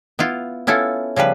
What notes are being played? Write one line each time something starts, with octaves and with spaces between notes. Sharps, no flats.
B3 E4 F4
B3 C#4 E4 F4 A4
C#3 F3 G3 B4